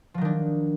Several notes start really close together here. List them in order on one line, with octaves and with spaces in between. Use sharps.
F3 F#3 D#3 D4